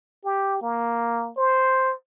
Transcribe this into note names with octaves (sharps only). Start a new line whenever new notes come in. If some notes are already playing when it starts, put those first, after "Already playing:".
G4
A#3
C5